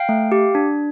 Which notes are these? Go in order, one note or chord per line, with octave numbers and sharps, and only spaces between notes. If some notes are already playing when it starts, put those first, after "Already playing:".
Already playing: F5 G5
A3
G4
D4